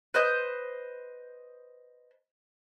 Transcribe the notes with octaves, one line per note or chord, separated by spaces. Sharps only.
B4 C5 D#5 G6